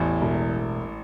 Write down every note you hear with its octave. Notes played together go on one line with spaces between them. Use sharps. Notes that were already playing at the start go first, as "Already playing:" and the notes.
Already playing: A1 E2 A2
E1